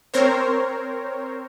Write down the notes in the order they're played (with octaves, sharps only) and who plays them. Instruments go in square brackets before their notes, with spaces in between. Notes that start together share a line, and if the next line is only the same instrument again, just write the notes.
[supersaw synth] C4 A#4 C5 C#5